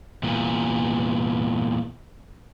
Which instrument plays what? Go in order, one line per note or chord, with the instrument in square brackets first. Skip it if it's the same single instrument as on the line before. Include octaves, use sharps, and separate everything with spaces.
[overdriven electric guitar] E2 A#2